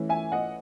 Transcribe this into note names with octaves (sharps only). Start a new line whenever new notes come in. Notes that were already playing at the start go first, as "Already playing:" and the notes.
Already playing: E3 A3 C#4 E4
E5 G#5
D#5 F#5